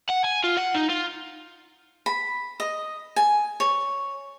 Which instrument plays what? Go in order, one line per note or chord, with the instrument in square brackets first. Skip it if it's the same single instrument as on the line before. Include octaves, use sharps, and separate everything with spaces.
[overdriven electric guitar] F#5
G#5
F4
F#5
D#4
F4
[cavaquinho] B5
D#5
G#5
C#5